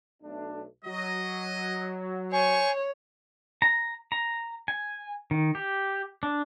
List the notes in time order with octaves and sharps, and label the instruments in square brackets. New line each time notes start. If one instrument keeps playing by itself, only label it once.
[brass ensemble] B1 A3 D4
[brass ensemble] F#3 [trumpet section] D#5
[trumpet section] C5 C6 C#6 [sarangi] C#5 [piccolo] G#5
[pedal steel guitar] A#5
A#5
G#5
D#3
G4
D4